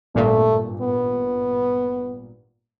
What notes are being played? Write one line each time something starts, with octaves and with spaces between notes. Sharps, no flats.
G#1 G2 A#2 A3
B3